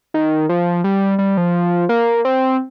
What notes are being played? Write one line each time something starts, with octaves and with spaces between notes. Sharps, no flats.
D#3
F3
G3
G3
F3
A#3
C4